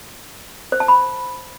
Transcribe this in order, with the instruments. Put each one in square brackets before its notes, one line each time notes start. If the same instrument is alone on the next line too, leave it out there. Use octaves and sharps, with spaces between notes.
[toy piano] C5
A5
B5